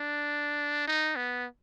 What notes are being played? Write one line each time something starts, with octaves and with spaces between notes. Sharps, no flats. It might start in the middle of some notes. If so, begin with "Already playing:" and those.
Already playing: D4
D#4
B3